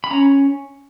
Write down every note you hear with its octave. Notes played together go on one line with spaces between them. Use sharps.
B5
C#4 A#5